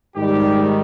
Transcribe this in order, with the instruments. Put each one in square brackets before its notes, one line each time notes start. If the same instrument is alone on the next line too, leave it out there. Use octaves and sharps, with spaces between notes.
[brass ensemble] G#2 D#3 G3 G4